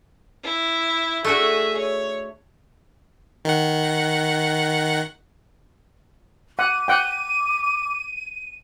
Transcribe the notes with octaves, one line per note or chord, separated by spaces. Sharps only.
E4
A3 D4 F#4 G#4 E5
C#5
D#3 F#5
F#5 D6 D#7
F#5 G5 D6